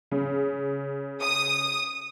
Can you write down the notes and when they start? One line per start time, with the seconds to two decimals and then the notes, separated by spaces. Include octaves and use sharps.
0.11 C#3
1.21 D#6